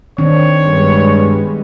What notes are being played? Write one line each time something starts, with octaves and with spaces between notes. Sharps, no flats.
D#3 C4 D4 C#5
G2 G3 G#3 B3